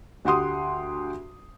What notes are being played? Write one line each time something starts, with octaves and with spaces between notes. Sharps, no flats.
D2 G4 F#5 C6 D#6